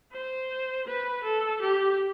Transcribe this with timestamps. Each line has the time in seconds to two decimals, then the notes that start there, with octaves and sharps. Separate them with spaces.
0.12 C5
0.86 B4
1.23 A4
1.61 G4